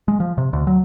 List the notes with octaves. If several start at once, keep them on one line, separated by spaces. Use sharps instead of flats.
G#3
F3
C3
D2
F#3